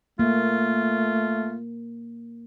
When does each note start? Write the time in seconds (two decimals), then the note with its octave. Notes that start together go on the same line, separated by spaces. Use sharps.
0.19 A3 A#3 F4